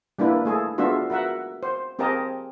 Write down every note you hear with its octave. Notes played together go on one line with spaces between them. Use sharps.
G3 A#3 D4 E4 B4
A3 G#4 A4
G#3 B3 D4 F4 F#4 E5
F#4 A#4 E5 F#5
C5
C4 G4 G#4 A#4 D#5 A5